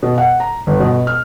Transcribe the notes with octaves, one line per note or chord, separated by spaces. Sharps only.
B2
F#5
A#5
G1
B2
F6